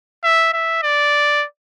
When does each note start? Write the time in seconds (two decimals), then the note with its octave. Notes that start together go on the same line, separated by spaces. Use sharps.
0.24 E5
0.53 E5
0.83 D5